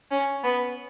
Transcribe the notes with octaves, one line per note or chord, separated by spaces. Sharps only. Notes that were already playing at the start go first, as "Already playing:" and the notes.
C#4
B3